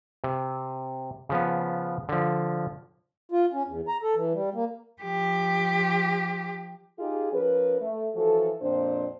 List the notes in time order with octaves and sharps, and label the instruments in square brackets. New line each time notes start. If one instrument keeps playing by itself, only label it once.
[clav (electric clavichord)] C3
C#3 F3 B3
D3 F3
[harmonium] F4
C#4
E2
A#5
A4
E3
G3
A#3
[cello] F3 G4
[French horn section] D#4 F4 G4 G#4
F3 C#4 A#4 B4
A3
E3 F3 F#4 A4
F2 A#2 C4 D4 C5